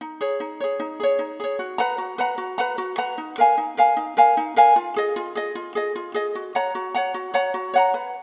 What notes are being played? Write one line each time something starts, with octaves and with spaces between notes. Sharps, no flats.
D#4
G#4 C#5
D#4
G#4 C#5
D#4
G#4 C#5
D#4
G#4 C#5
F#4
B4 F#5 A#5
F#4
B4 F#5 A#5
F#4
B4 F#5 A#5
F#4
B4 F#5 A#5
D#4
A#4 F5 G#5
D#4
A#4 F5 G#5
D#4
A#4 F5 G#5
D#4
A#4 F5 G#5
F4
G#4 D#5
F4
G#4 D#5
F4
G#4 D#5
F4
G#4 D#5
F#4
C#5 F#5 A#5
F#4
C#5 F#5 A#5
F#4
C#5 F#5 A#5
F#4
C#5 F#5 A#5
B4